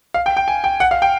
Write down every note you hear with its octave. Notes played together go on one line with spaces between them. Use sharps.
F5
G5
G5
G#5
G5
F#5
F5
G5